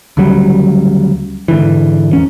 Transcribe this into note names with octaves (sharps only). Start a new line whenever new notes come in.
D2 C#3 F#3 G3
G#2 D3 E3
E2 C#4